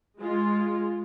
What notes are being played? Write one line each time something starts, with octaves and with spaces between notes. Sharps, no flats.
G#3 F4